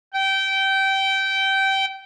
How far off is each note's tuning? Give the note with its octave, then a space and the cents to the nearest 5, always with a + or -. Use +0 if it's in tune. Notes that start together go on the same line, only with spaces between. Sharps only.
G5 -20